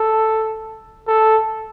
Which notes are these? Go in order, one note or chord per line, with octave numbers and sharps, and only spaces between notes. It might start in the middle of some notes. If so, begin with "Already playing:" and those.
Already playing: A4
A4